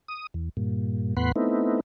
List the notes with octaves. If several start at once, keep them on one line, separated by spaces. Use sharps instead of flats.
D#6
E2
G2 A#2
E2 A2 B3 F#5 B5 C6
A3 B3 C4 D#4 E4